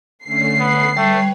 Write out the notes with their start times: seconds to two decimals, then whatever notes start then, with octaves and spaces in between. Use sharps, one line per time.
0.25 D3 A3 C#4 C7
0.60 B3
0.97 G3 A3 B4 C#5